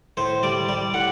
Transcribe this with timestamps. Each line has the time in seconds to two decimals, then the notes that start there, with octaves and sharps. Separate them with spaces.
0.17 A2 C5
0.43 G3 D5
0.69 G3 D5
0.94 A2 F#5